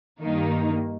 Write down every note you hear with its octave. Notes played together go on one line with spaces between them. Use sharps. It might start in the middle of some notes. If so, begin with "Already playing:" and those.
G2 D#3 A#3 D#4